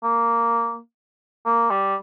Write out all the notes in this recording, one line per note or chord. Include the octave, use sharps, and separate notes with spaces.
A#3
A#3
G3